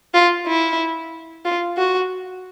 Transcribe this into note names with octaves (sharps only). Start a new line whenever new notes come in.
F4
E4
F4
F#4